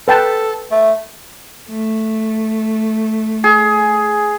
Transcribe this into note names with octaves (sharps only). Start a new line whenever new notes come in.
A4 B4 G5 A5
A3
A3
G#4